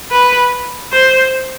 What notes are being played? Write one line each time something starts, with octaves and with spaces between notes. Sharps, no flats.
B4
C5